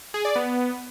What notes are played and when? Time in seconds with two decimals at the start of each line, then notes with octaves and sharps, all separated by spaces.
0.14 G#4
0.25 D5
0.36 B3